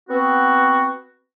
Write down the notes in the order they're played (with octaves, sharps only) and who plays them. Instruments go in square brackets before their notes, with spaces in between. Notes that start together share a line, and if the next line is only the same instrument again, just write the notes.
[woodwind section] B3 C4 F#4